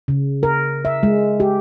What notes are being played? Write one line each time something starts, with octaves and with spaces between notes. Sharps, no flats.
C#3
A#4
E5
G#3
G4